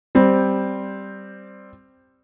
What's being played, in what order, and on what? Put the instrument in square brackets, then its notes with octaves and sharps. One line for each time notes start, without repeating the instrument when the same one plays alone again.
[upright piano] G3 C4